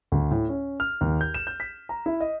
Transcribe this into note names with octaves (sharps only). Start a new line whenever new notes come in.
D2
A2
C#4
F6
D#2
G6
E7
G6
B6
A#5
E4
D#5